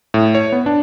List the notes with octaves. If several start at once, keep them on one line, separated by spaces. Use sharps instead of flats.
A2
C#5
B3
D4